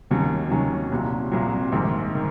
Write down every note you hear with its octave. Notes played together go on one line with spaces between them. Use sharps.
D#2 D#3 F#3 C#4
D#2 D#3 F#3 C#4
C2 A#2 F#3
C2 A#2 F#3
A#1 G#2 D#3
D#3